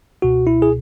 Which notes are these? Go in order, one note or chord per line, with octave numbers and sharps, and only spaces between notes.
C#2 B2 F#4
E4
G#4